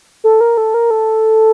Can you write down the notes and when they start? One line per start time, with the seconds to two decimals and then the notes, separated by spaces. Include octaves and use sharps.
0.24 A4
0.41 A#4
0.57 A4
0.74 A#4
0.91 A4